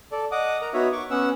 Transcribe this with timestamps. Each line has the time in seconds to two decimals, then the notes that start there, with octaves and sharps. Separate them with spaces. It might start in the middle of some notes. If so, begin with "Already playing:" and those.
0.12 A4 D5
0.31 D#5 F#5 D6 D#6
0.61 A#4 A#5
0.74 B3 D#4 F#4 C#5 E5
0.92 C#6 D6
1.10 B3 C#4 F#5 E6